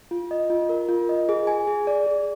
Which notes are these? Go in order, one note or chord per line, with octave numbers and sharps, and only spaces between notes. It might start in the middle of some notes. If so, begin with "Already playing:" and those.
F4
D#5
F4
A#4
F4
D#5
G#4
G#5
G#4
D5
G#4